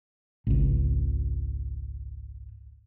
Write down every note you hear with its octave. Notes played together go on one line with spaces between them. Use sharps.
G#1 C#2